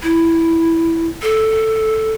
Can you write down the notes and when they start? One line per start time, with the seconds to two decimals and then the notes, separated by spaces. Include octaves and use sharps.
0.03 E4
1.22 A4